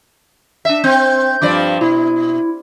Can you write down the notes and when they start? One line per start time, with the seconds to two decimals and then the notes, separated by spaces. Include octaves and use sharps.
0.65 D4 E5
0.84 C4 G6
1.42 G2 F3 D5
1.81 B2 E4